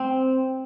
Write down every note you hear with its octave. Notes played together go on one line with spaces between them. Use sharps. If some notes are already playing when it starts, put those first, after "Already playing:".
Already playing: C4